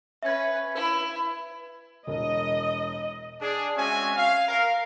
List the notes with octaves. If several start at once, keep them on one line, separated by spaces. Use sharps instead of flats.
C#4 B4 E5 G#6
E4 B4
E1 D#5
D4 G#4
G#3 C4 C#4 F#4 E5 G#5
F5
A#4 F5